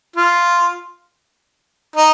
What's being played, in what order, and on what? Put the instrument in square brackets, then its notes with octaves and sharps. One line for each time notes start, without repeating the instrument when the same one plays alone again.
[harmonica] F4
D#4